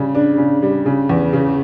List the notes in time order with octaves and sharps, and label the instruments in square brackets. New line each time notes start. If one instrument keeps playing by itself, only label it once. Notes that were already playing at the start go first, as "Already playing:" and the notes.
Already playing: [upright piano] C#3 G3
D4
C#3
G3
C#3
E2
C#3